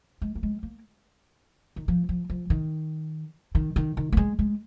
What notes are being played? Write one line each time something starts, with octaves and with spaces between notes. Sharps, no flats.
G#3
A#3
G#3
A#3
D#3
F3
F3
F3
D#3
D#3
D#3
D#3
A#3
G#3
G#3